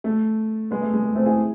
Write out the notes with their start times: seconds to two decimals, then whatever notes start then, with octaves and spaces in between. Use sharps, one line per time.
0.04 A3
0.71 G#3 B3
0.82 A3
0.94 G#3
1.04 A3
1.15 A3 C4
1.26 E4 G#4